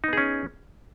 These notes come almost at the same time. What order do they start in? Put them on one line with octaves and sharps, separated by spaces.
D#4 B3 G#4 C#4